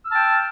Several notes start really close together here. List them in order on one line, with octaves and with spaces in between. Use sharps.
E6 F6 A5 G5